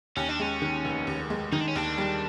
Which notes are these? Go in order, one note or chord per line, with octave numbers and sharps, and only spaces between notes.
D#2 C#4
D4
G#3 C#4
D#3
F1
D#2
G#3
D#3 D#4
D4
C#4
D#2 D4
G3